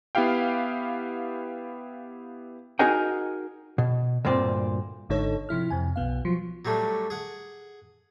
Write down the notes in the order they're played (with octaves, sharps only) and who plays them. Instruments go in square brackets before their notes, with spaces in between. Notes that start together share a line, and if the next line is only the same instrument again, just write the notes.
[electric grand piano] B3 E4 G4 F5 G5
[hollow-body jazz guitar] D#4 F#4 G#4 A#4 D#5 G5
B2
D2 G2 A#2 C4 D5
[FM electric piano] G#1 G#2 D3 D#4 A4 C#5
C3 F3 E4 F6
F2 C3 G#5
B1 B2 B3 F5
F3 F#3
[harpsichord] F#3 G3 A3 C#4 D4
G#4 F#5